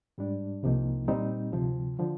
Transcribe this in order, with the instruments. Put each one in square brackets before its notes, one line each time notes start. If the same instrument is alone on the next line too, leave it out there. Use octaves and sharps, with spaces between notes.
[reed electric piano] G#2 G3 D4
C2 C3 F3 A#3 D#4
A#2 G3 C4 D#4
D2 C3 F3
D3 F3